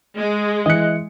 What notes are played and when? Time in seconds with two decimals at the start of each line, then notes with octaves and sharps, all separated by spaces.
0.16 G#3
0.66 E3 D#5 F#6 C#7